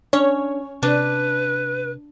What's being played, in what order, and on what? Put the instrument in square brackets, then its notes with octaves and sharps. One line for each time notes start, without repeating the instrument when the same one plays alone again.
[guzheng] C#4 [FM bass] D4 [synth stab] C#5
[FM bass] C3 [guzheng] D4 [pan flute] B4